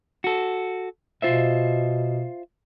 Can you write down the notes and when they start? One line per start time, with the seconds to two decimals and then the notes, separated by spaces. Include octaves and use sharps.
0.24 F#4 A4
1.22 B2 F4 C5 E5